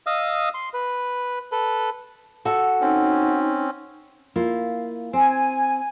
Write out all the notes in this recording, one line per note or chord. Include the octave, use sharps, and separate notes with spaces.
D#5 F5 D#6 E6
C6
B4
A4 B4
F#4 A4 F#5
C4 C#4 D#4
A#3 E4 F4
C4 G#5